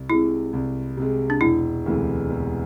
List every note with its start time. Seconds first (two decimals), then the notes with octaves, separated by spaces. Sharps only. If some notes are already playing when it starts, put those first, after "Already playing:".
Already playing: C2
0.10 C3 G#3 E4
0.53 C2
0.97 C3 G#3
1.30 D4
1.41 E1 E4
1.86 D2 C3 E3 G#3
2.30 E1